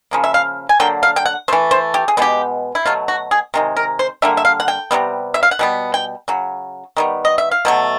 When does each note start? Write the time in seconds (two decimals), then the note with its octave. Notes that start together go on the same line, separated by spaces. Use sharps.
0.11 C#3 F3 A#3
0.24 E5
0.34 F5
0.69 G#5
0.80 D3 F#3 A#3 G5
1.03 F5
1.16 G5
1.26 F#5
1.48 E3 A3 C5
1.71 C5
1.94 G4
2.08 G#4
2.17 B2 G#3 B3 G4
2.75 E4
2.86 B2 F#3 A3 F4
3.08 F#4
3.31 G#4
3.54 C3 D#3 G#3
3.76 A#4
3.99 C5
4.22 D3 G3 A#3 E5
4.37 E5
4.45 F5
4.60 F#5
4.68 G5
4.91 C3 D#3 G3 B3
5.34 E5
5.43 F5
5.51 F#5
5.59 B2 G3 B3
5.94 G5
6.28 C#3 F#3
6.97 D#3 G3 B3
7.25 D#5
7.38 E5
7.51 F5
7.65 B2 F#3 A3